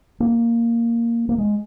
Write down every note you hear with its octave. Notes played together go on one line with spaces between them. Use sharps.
A#3
A#3
G#3